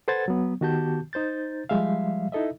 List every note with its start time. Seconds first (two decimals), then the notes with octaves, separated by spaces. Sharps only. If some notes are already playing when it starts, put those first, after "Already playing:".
0.08 A4 B4 C5 F#5 G#6 A6
0.28 F#3 B3
0.61 D#3 B3 F#4 G4 A5 G6
1.13 D#4 C5 G6 A6
1.69 F3 G3 G#3 E5 F5
2.32 D#4 E4 A4 D#5 E5